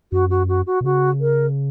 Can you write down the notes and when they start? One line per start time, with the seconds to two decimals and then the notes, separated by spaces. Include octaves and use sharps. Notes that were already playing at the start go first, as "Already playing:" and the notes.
0.12 F#2 F#4
0.30 F#4
0.48 F#4
0.66 F#4
0.81 B2
0.85 C#3 F#4
1.21 A#4